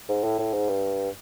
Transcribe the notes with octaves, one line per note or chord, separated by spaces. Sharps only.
G#2
A2
A2
G#2
G2